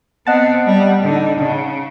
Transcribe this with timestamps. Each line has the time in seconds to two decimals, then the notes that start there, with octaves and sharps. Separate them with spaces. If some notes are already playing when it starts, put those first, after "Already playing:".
0.27 B3 C4 D#5 F#5 A5
0.66 G3
1.02 D3 D#4
1.39 C#3